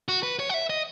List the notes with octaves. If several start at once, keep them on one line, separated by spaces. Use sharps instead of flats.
F#4
B4
C#5
F#5
E5
D#5